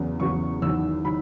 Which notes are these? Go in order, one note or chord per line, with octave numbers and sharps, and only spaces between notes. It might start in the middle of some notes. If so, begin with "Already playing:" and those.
Already playing: E2 C#3 F#3 B3
E2 C#3 F#3 B3 C#6
E2 D#3 F#3 E6
D#3 F#3 B5